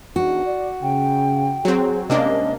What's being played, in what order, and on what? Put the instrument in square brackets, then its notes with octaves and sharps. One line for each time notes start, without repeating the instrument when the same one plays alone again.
[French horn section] E2 D#3 D4 [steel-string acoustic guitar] F#4
[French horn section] D5
[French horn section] C#3 [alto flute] G5
[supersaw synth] F#3 C4 [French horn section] G#4
[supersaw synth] C3 A#3 D4 [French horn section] G3 G#3 C#4 [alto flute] D#5